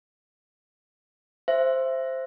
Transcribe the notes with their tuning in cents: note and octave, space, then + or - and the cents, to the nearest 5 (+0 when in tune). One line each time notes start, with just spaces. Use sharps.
C5 +0 E5 +15